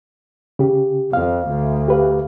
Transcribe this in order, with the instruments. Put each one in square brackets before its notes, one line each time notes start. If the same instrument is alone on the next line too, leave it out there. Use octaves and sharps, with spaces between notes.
[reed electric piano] C#3 G4
[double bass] F2 [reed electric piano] F5
[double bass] D2
[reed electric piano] G4 B4 F5